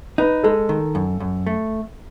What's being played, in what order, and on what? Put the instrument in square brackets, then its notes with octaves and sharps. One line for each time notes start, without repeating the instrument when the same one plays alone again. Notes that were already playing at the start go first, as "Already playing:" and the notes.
[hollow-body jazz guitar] D#4 [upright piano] B4
[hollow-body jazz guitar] G#3 [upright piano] A4
[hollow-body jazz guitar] D#3
F#2
F#2
A3